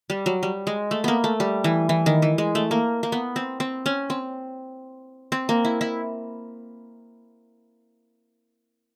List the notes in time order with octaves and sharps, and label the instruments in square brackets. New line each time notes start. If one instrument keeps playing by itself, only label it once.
[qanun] G3
F#3
G3
G#3
A3
A#3 B3
A3
G3
E3
E3
D#3
E3
G#3
A3
A#3
A#3
B3
C4
C4
C#4
C4
C4
A#3
E4
E4